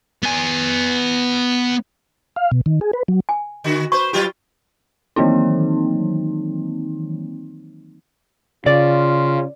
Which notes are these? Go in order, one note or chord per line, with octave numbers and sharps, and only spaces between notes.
B3 G#5
F5
B2
D#3
G#4
B4
F#3
G#5
D3 F#4
B4 C5 C#6
F#3 F4 G4
D#3 E3 F#3 A#3 C4 D#4
C#3 F4 D5